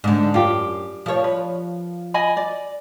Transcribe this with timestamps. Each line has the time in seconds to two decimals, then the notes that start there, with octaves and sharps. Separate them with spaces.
0.04 G#2 D3
0.34 F#2 F4 G4
1.06 F3 C#5
1.24 B4
2.14 D#5 G#5 B5
2.37 D5